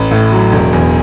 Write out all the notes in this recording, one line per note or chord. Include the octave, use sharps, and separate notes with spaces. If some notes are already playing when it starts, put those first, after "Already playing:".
Already playing: A1
A2
F#3
E1
E2